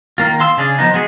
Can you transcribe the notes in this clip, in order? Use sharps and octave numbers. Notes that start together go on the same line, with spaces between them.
D#3 A#3 F4
F5 C6 E6
C#3 C#4 D4 G#4 D5
F3 B3 D#4
G#3 B3 F#4 G#4